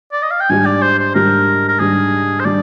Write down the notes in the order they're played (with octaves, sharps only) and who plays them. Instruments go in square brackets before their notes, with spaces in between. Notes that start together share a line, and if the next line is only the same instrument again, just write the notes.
[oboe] D5
D#5
F5
G5
[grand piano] G#2 G3 D4 G4 [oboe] G#5
[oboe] D5
C5
C5
[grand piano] G#2 G3 D4 G4 [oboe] A#4
[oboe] A#4
[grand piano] G#2 G3 D4 G4 [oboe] G#4
[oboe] C5
[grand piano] G3 D4 [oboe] D5